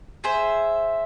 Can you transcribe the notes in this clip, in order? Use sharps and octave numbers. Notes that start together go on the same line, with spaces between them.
G#4 C5 E5